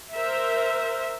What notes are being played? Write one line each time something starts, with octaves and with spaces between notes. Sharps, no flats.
A#4 C5 E5